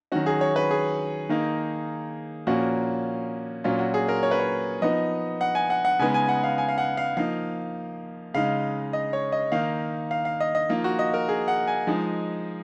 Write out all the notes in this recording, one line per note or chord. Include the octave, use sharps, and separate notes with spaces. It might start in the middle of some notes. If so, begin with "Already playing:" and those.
D#3 F#3 C#4 F#4
G#4
C#5
B4
G#4
D#3 A#3 D#4
A#2 F3 A#3 C#4 F#4
A#2 F#3 C#4 F4
F#4
G#4
A#4
C#5
B4
C#5
F3 B3 D#4 D#5
F#5
G#5
F#5
F#5
C#3 G#3 B3 D#4 G#5
G#5
F#5
F5
G#5
F5
F#5
F5
F3 A#3 D#4 F5
C#3 G#3 D#4 F5
D#5
C#5
D#5
D#3 A#3 D#4 F5
F5
F5
D#5
D#5
F3 A#3 D#4 F4
F#4
D#5
A#4
G#4
F#5
G#5
F3 G#3 D#4